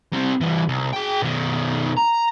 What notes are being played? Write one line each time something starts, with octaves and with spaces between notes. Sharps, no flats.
G3 C4
E3 G3
C2
G#4 G5
B2 D#3
A#5